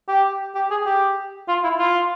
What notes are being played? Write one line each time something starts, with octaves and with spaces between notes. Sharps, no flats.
G4
G4
G#4
G4
F4
E4
F4